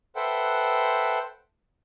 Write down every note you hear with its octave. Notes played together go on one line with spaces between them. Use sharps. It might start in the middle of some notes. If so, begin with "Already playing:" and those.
A4 B4 C5 E5 F#5 G5